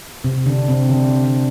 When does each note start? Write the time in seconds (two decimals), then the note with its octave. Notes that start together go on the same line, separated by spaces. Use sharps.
0.24 C3 C4
0.46 D3 D4
0.68 C3 C4
0.89 D3 D4